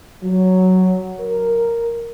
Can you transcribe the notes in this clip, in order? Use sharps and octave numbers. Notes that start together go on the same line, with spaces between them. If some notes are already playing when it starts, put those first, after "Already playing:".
F#3
A#4